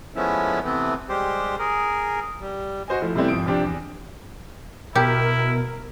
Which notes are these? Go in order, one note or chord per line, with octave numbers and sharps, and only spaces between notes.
F3 G#3 A3 B3 C#4 E4
C3 E3 A3 B3 C4
G3 G#3 G4 C5
G#4 A#4
G3
F#4 C5 D#5 G#5
F3 A3 E4
C3 G3 A3 B3 C4 E4
G#1 F3 D#6 D7
C3 F3 C4 D4 G4
E2
B2 E4 G4 A#4